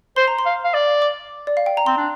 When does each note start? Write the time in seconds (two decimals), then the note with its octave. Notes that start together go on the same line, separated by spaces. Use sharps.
0.16 C5 C6
0.28 A#5
0.39 C6
0.45 F5
0.64 F5
0.74 D5
1.02 D6
1.47 D5
1.57 F5
1.66 G5
1.77 A#5
1.86 C4 C6
1.97 D4